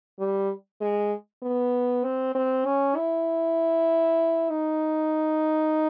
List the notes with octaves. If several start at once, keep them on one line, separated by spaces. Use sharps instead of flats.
G3
G#3
B3
C4
C4
C#4
E4
D#4